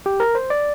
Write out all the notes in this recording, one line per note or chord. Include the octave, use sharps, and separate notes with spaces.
G4
A#4
C5
D5